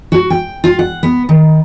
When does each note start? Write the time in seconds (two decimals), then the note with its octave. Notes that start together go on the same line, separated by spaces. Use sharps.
0.12 F#4
0.30 G5
0.64 F4
0.79 F#5
1.03 B3
1.29 D#3